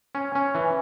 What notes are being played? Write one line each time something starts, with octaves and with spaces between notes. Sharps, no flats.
C#4
C#4
E3